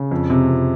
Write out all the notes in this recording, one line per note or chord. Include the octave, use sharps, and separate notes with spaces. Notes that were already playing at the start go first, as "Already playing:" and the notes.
Already playing: C#3
F2
C3
F2